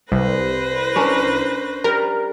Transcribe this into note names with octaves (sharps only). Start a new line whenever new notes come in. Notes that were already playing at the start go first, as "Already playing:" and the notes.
C2 B4 C5 A#6
C#4 D4 A#4
G3 A#4